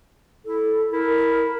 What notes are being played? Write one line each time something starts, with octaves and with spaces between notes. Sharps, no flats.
E4 A4
E4 A#4